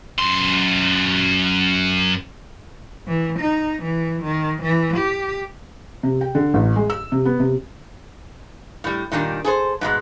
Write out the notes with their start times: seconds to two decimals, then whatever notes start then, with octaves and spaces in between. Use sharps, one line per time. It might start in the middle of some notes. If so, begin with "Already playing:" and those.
0.19 F#2 C6
3.07 E3
3.40 D#4
3.83 E3
4.24 D#3
4.63 E3
4.97 G4
6.03 C3
6.21 G5
6.35 D3
6.54 A1
6.76 G#3
6.90 E6
7.12 C3
7.25 B3
7.40 C3
8.84 A2 G3
9.12 A#2 D#3 G3 D4
9.44 G#4 A4 C5
9.81 G#2 B2 G#3